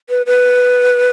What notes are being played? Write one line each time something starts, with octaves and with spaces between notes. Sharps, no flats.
B4
B4